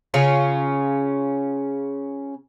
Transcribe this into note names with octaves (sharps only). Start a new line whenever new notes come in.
C#3 C#4 F4